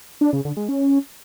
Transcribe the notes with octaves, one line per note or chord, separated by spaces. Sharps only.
D4
C#3
D3
G#3
C#4